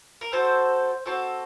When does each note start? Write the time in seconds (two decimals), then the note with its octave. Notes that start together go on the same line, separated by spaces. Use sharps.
0.21 A#4
0.32 C4 F#4 A4 C5
1.05 C4 F#4 A4